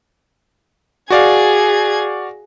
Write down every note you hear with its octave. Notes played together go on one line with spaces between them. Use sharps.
F#4 G#4 D5 F5 G#6